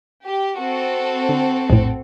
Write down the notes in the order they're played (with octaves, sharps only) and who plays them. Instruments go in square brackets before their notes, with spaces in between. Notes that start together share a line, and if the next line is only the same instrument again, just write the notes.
[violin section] G4
C4 F#4 A4
[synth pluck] D3
A#1 F2 A2